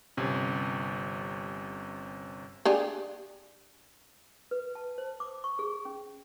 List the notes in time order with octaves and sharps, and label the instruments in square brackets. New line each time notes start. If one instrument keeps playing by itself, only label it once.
[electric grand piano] G1 C3 C#4
[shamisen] D4 G4 G#4
[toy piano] B4
A5
C5
D6
C#6
G#4
C#4